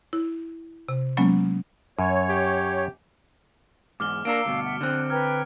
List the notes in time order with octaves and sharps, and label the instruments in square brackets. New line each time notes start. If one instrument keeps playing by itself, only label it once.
[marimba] E4
C3
F#3 G#3 A#3 B3 C#4
[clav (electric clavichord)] F#2 [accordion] C#5
[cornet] G4
[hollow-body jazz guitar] E2 G#2 [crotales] D6 F6 G7
[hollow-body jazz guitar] A#3 D4 A#4 [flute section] F5 E6 [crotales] C#7 D7
[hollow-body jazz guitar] D2 G2 B2
[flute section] E5 F#5
[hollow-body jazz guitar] D3 C4 [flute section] F#6
[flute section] B4 G5 A#5 [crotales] F6 G#6